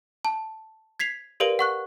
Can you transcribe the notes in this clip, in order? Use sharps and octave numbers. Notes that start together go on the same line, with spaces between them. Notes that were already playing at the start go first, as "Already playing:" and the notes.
A5
G#6 B6 C7 F7
G4 A#4 B4 D5 F5 D7
F#5 C#6 F#6